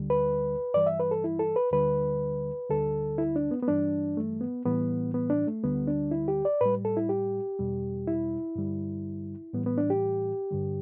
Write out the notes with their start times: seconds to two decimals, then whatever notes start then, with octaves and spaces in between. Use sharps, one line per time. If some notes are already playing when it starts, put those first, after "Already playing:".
Already playing: D2 D3 G3
0.10 B4
0.74 G2 E3 G3 D5
0.86 E5
1.00 B4
1.11 A4
1.24 E4
1.39 A4
1.56 B4
1.72 D2 D3 G3 B4
2.70 D2 D3 G3 A4
3.18 E4
3.36 D4
3.51 B3
3.63 B3
3.68 G2 E3 G3 D4
4.17 A3
4.41 B3
4.65 A2 E3 G3 B3
5.14 B3
5.30 D4
5.47 A3
5.63 D2 D3 G3 B3
5.87 D4
6.11 E4
6.28 G4
6.45 D5
6.61 A2 G3 B4
6.85 A4
6.97 E4
7.09 G4
7.59 E2 B2 G3
8.07 E4
8.56 G2 D3 G3
9.53 A2 E3 G3 B3
9.66 B3
9.78 D4
9.90 G4
10.51 G2 D3 G3